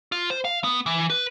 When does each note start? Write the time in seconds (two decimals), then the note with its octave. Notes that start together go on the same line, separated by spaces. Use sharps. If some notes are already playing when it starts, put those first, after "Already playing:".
0.12 F4
0.30 C5
0.45 F5
0.64 B3
0.86 E3
1.10 B4